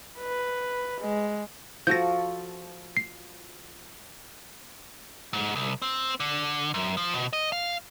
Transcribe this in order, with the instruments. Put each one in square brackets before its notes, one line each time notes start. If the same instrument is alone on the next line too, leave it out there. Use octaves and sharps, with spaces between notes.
[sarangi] B4
G#3
[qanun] F3 F#4 A4 [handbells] G6 A#6
[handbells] C7
[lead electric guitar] G#2
C2
C4
D3
F#2
F3
B2
D#5
F5